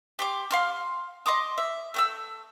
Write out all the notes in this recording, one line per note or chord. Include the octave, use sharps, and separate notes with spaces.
G4 C6 D6
F5 C6 F6
D#5 C6 D6 D#6
E5
A3 F#5 E6